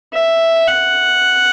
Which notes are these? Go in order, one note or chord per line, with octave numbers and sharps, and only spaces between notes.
E5
F#5